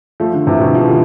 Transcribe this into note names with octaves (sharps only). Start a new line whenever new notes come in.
F3 A3
D3 F3
C3 E3
B2 D3
F3
E3
D3